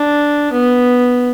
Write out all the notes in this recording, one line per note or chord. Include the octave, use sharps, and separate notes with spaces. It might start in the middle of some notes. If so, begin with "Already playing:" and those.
Already playing: D4
B3